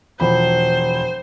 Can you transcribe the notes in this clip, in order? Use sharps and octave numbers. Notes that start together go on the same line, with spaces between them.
E1 F3 C5 B5